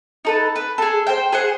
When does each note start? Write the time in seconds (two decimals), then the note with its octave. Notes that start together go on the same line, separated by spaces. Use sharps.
0.25 D#4 A4 B4
0.56 B4
0.78 G#4 A4
1.07 C5 G5
1.32 G#4 C5 F#5